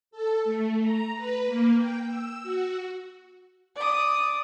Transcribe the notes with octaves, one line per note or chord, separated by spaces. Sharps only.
A4
A3
A#5
B4
A#3
G5
E6
F#4
D5 D#6